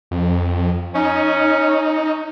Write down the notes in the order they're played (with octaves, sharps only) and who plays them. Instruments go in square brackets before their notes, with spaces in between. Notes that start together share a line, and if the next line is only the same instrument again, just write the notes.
[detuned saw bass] F2
[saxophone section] C#4 [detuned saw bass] D#4